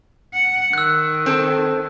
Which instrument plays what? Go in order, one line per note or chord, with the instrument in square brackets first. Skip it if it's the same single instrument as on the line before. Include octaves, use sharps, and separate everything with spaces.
[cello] F#5
[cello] D#3 [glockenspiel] E6 F#6
[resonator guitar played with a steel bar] C4 A4